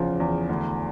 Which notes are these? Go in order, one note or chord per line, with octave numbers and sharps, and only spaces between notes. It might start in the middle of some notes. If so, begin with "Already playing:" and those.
Already playing: E2 C#3 F3
E2
D2